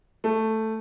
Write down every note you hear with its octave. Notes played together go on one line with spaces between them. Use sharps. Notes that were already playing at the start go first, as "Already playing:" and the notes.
A3